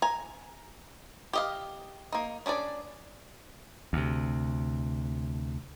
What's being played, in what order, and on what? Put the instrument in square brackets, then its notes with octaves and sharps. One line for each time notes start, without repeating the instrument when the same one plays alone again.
[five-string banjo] G#5 A#5
G4 D#5 F5
A#3 D#4
C#4 D4 G#4 D5
[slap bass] D2 C3